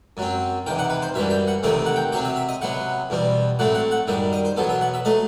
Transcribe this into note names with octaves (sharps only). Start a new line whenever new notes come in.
F#2 F#3 C4
E2 C3 D#3 G5
F#5
B4
C5
F#2 E3 G3 E5
G5
F#5
E2 C3 D#3 A3 C4 E5
F#5
G5
C3 F#3 C4 G5
E5
E5
D#5
C3 F#3 B3 F#5
E2 B2 G3 C4
A2 F#3 A3 C4 F#5
F#5
F#5
F#2 D#3 G3 E5
D#5
C5
E2 B2 F#3 B3 A4
E5
F#5
E5
F#3 A3 D#5